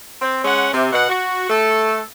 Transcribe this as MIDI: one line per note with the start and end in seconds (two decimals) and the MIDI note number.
0.22 0.44 60
0.45 0.68 56
0.45 0.68 61
0.45 0.68 78
0.73 0.90 48
0.92 1.07 47
0.92 1.07 78
1.09 1.46 66
1.48 1.98 57
1.48 1.98 69